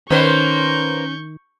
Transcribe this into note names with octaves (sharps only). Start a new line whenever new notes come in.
D#3 A#3 C#4 B4 C5 C#6 G6